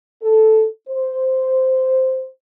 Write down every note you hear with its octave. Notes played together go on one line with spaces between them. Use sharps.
A4
C5